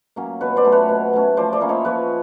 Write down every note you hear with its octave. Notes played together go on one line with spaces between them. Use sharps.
F#3 A#3 C#4
B2 B4 C#5
C5 D5
F#3 A3 C#4
B4 C#5
B2
F#3 A3 C#4
F3 C5 D5
C5 D5
A#3 C#4 E4
C#5 D#5
F3 B4 C#5